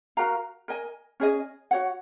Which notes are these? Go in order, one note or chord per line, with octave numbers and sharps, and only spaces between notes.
F#4 A#4 F5 A#5
A#4 D#5 G#5
C#4 G#4 D#5
F#4 C#5 F#5